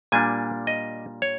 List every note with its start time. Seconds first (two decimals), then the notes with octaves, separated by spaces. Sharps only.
0.12 A#2 G3 A#3 D4 G#5
0.67 D#5
1.22 C#5